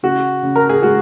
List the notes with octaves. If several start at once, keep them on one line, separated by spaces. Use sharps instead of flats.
C#3 F#4
C#3
A#4
G#4
G#3 F#4